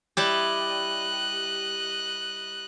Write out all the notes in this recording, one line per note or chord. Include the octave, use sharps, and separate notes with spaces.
G3 E4 G4 D#5 F#6